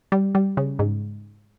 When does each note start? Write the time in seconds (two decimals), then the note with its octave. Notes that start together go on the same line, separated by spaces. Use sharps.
0.12 G3
0.35 G3
0.57 C#3
0.79 G#2